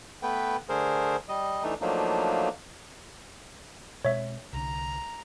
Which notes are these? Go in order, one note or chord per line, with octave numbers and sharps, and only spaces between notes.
A3 B3 B4 G5
D3 A3 G#4 A#4 C5
G3 D#5
E3 A3 D4 D#4
F3 F#3 A3 A#3 D4 D#4
B2 G#3 C4 C#5 E5
C2 D3 A#5